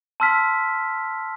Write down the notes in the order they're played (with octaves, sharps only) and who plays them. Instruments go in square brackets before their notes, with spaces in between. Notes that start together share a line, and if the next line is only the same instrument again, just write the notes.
[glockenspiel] A5 C6 E6 F6 B6